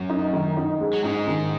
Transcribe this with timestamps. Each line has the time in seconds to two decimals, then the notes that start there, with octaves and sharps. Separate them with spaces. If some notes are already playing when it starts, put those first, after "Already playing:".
Already playing: F#2 F#3
0.10 D#4
0.33 D#3
0.57 D#4
0.80 G#3
0.93 F#3
1.04 G#2 G#3 D#4
1.28 D#3